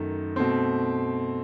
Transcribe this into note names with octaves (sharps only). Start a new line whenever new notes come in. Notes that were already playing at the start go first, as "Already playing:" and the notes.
Already playing: F#2 D#3 A3
B2 A3 C4